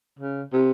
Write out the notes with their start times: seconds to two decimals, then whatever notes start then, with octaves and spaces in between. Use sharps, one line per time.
0.19 C#3
0.53 C3